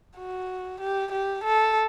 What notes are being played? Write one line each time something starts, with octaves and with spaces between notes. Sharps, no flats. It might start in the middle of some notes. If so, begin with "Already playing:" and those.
F#4
G4
G4
A4